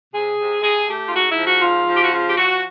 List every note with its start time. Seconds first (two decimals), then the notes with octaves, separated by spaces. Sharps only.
0.12 C3 G#4
0.38 C3
0.61 C3 G#4
0.87 A3 G4
1.06 F4
1.11 G#2 F#4
1.27 E4
1.37 F3
1.44 F#4
1.60 G#2 F4
1.86 F3
1.93 G4
2.01 F#4
2.10 C#3 F4
2.26 G4
2.35 F3 F#4